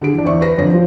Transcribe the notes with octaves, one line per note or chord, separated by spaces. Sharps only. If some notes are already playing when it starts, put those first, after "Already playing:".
D3 G#4 D7
E3 D4
E2 C5 D5 E5 C#6
B4 A#6
F2 D3 C#5 A#6
F3 C5